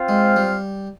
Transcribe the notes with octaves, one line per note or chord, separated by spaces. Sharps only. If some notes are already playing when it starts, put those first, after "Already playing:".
Already playing: C4 F4 C5 F5
G#3
G3